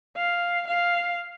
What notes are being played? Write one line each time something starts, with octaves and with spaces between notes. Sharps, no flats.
F5
F5